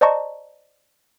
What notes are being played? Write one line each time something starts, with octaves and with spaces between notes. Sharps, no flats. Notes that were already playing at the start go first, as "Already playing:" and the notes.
C5 D5 D#5 A5 A#5 C#6